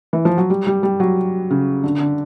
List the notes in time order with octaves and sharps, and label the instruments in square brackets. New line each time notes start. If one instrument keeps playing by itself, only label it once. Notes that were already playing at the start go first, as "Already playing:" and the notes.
[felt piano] E3
F3
F#3
G3
G3
G3
F#3
C#3
D3
D3